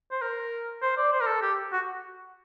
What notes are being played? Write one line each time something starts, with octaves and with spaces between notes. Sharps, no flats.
C5
A#4
C5
D5
C5
A#4
A4
G4
F#4